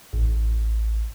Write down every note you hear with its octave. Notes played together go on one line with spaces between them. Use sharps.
A1